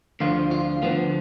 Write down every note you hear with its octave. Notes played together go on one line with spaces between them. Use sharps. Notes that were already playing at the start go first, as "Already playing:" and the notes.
D2 D3 F3 F4
F4
D2 D3 F3 B3